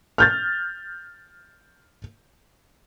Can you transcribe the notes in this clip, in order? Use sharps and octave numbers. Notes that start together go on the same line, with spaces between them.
F6 G6 A6